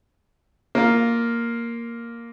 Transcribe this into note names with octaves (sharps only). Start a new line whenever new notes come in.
A#3 F4